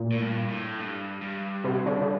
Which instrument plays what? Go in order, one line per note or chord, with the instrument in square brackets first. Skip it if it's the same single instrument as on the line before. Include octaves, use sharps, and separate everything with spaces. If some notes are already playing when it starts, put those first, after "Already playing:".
Already playing: [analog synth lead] A#2
[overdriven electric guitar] A2
G2
A2
G2
G2
[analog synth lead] C3
D3
D3